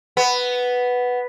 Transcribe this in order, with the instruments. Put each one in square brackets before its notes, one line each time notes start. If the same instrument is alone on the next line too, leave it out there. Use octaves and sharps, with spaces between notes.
[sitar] B3